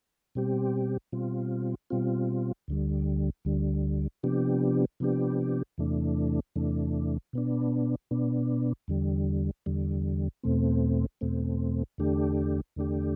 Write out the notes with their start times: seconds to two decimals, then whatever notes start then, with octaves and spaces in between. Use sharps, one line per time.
0.35 B2 G3 C4 G4
1.12 B2 G3 C4 F4
1.90 B2 G3 C4 F4
2.68 D2 D3 G3
3.45 D2 D3 G3
4.23 C3 F3 B3 D4 G4
5.00 C3 F3 B3 D4 G4
5.78 E2 C3 E3 A3 D4
6.56 E2 C3 E3 A3 D4
7.33 B2 B3 D4
8.11 B2 B3 D4
8.88 E2 D3 G3
9.66 E2 D3 G3
10.44 E2 B2 A3 C4
11.21 E2 B2 A3 C4
11.98 E2 D3 A3 D4 G4
12.76 E2 D3 A3 D4 G4